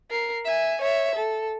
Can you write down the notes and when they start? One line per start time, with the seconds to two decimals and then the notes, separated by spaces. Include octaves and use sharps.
0.11 A#4 C7
0.45 E5 G#5
0.82 C#5 E5
1.15 A4